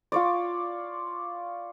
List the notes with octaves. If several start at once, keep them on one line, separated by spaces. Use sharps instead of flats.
F4 C#5 D5